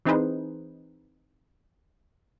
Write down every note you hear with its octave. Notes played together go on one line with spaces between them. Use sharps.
E3 C4 D#4 G#4 B4 C5